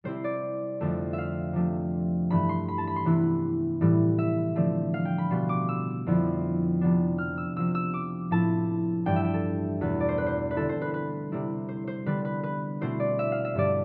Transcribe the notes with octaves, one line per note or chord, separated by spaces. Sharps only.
C3 G3 C4 E4 C5
D5
F2 D3 A3 D4
E5
F5
C3 F3 A3 D4
G2 E3 A3 B5
C6
B5
A5
B5
C6
C3 E3 B3 E4
A2 E3 G3
E5
D3 F3 A3 C4
F5
G5
B5
B2 G3 B3 C6
D6
E6
F2 D3 F3 B3 E4
C3 F3 B3 D4
F6
E6
C3 F3 C4 E6
E6
D6
A2 F3 C4 E4 A5
G2 E3 G3 D4 G5
E5
G5
A4
E2 B2 A3 B4
D5
C5
B4
C5
B4
D3 G3 C4 E4 A4
C5
B4
B4
C3 G3 C4 E4
C5
C5
D3 G3 B3 D4 B4
B4
B4
B2 A3 C4 E4 C5
D5
E5
F5
E5
G2 D3 G3 D5